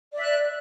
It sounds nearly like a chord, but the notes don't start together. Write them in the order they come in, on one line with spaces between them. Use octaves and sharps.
D5 E5 F#6